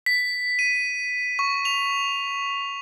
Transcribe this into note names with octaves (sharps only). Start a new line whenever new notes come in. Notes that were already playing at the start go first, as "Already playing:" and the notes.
B6
D#7
C#6
F7